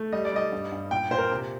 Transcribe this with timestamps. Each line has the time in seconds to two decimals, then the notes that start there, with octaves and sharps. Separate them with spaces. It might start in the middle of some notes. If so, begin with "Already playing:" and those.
Already playing: A3
0.12 G3 D#5
0.25 D5
0.32 G3 D#5
0.52 G2
0.72 G2
0.91 A#2 G5
1.11 A#2 C5
1.18 A#4
1.31 C3